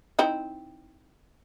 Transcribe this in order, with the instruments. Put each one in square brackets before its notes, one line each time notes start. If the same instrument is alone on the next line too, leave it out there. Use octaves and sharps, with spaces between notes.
[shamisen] C4 D#4 E4